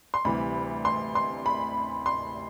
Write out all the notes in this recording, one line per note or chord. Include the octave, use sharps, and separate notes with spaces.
C6
D2 C3 E3 G3 B5
C6
C6
B5
C6